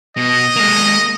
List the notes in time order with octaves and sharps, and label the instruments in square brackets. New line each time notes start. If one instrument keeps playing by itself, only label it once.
[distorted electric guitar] B2 [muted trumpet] D#5
[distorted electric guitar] G#3 A#3